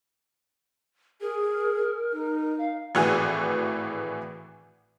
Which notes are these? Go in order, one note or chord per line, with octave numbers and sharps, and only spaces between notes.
G#4 A#4
D#4
F5
G#1 A2 E3 F#4 G#4 G#5